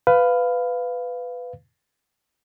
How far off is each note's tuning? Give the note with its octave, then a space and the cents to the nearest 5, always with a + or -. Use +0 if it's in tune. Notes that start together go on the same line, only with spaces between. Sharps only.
B4 +15 F5 +0